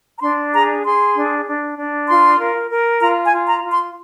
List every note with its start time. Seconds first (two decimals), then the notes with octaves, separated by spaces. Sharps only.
0.18 A#5
0.22 D4 C6
0.53 G#4 A#5
0.84 G#4 C6
1.16 D4
1.46 D4
1.78 D4
2.08 F4 C6
2.39 A#4
2.70 A#4
3.01 F4 A#5
3.25 G#5
3.32 F4
3.48 A#5
3.63 F4
3.71 C6